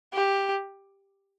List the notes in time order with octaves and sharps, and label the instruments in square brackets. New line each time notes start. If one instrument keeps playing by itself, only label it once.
[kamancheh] G4